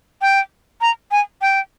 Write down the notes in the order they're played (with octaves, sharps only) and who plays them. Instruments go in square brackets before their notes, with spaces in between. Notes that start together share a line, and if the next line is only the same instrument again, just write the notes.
[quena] G5
A#5
G#5
G5